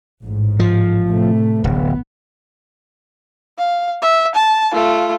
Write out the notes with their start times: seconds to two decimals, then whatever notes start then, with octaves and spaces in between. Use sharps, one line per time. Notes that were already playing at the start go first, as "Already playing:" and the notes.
0.23 A1 G#2
0.59 F3
1.07 A2 C3 A3
1.64 D1 A1 B3
3.58 F5
4.02 E5
4.35 A5
4.73 A3 F4